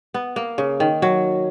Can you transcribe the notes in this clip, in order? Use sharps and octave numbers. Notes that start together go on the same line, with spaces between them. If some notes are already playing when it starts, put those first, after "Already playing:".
B3
A#3
C#3
D#3
F#3